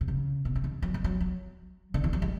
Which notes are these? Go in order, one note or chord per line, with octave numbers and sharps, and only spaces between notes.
B2
C#3
B2
C#3
D3
F#3
G#3
F#3
F#3
D3
E3
F#3
G#3